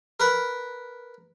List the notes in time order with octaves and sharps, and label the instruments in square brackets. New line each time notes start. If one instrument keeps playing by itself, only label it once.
[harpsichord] A#4 B4